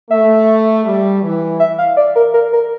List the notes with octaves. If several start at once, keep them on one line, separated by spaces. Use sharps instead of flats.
A3 E5
G3
E3
E5
F5
D5
A#4
A#4
A#4